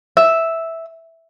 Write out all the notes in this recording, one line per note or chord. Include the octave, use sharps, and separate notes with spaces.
E5